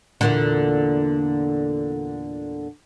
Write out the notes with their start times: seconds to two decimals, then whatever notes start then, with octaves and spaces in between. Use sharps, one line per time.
0.21 E2 A#2 D3